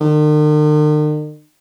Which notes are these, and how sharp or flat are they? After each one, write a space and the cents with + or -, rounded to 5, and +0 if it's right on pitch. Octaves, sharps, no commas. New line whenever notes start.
D#3 -45